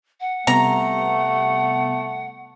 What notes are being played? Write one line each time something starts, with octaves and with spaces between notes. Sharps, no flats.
F#5
C3 G3 A3 B3 A#5